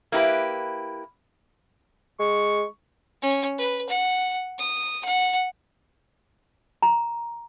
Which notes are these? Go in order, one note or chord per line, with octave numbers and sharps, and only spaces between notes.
A#3 E4 G4 B4
G#3 C#6
C#4
B4
F#5
D#6
F#5
A#5